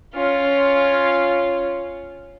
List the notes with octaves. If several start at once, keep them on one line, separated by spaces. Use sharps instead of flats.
C#4 F4